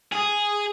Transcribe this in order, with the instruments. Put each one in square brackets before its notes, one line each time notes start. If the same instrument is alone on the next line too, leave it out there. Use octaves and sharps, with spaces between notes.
[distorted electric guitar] G#4